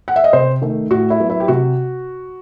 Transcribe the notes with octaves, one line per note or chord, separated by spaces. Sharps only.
F#5
E5
D#5
C3 C5
D#3 A3
A2 F#4
E4
F#3 B3
E4
G4
C3 F#4